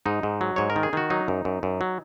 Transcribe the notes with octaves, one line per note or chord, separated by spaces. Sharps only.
G#2 D#4
G#2
F#3
G#2 C#5
A#4
D#3
G#4
D#3 F#4
F#3 D#4
F#2
F#2
F#2
F#3